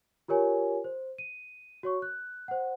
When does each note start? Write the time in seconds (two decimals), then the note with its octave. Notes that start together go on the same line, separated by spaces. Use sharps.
0.28 F4 G4 A#4 C#5 G#5
0.84 C5
1.18 D#7
1.83 F#4 C#5 C#6
2.02 F#6
2.48 C5 F#5